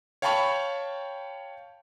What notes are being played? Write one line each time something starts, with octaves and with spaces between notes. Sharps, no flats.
C#5 F5 G5 A5 B5 C#6